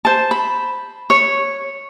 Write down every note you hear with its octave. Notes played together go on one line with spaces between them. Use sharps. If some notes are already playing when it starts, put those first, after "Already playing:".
C5 A5
B5
C#5